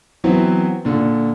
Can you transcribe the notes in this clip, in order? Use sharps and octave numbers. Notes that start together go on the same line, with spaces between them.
E3 F#3 B3 C4 E4
A#2 D3